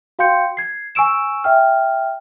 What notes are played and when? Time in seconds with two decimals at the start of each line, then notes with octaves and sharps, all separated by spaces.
0.19 F#4 F5 G5 C6 G6 C#7
0.57 G#6 C7
0.95 G#5 C#6 E6 D7 E7
1.44 E5 G5 F6